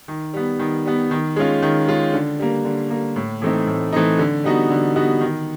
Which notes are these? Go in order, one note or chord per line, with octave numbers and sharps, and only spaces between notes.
D#3
G3 B3
D#3
G3 B3
D#3
G#3 C#4 F4
D#3
G#3 C#4 F4
D3
G3 A#3
D3
G3 A#3
A2
E3 A3 C4 D#4
A2
E3 A3 C4 D#4
D3
G3 B3 D#4 F#4
D3
G3 B3 D#4 F#4
D#3